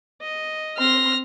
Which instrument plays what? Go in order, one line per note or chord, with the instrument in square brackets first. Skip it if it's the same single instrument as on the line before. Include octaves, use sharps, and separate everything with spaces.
[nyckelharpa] D#5
[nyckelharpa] C4 C6 [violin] F6 A#6